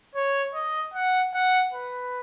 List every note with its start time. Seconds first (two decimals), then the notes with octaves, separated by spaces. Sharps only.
0.15 C#5
0.54 D#5
0.94 F#5
1.34 F#5
1.73 B4